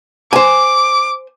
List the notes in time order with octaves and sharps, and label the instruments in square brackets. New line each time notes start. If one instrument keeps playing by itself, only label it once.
[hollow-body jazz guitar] C5 G#5 [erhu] D6